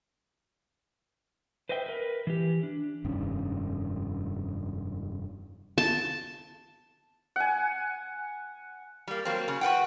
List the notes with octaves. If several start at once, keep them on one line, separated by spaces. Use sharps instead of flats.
B4 C5 D#5 E5 G5
A#4 B4
E3 G4
D4
F1 G2 D#3 C#4
A5
F#5 G#5
G3 A#3
F#3 A#3 C4
C#3
F#4 B4 F#5 G5